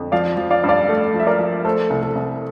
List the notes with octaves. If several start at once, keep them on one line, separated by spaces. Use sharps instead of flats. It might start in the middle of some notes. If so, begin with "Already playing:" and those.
Already playing: F2 D3
F3 D5 F5
F3
D5 F5
G2
D5 F5
A3
F3
E5
A#4 D5
F3
A3 A4 C5
C2
A4
C2